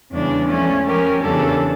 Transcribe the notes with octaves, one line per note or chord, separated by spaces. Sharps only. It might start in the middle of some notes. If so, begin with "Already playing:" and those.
E2 C#3 G3 D4
F3 A3 C#4
F3 C#4 G4 A#4
E2 C#3 G3 D4 A4